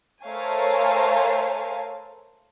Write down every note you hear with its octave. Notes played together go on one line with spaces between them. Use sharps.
A3 A#4 C5 C#5 F5 G#5